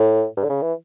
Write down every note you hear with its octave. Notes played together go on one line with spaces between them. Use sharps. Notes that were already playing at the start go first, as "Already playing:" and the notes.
Already playing: A2
G2
D3
C#3
E3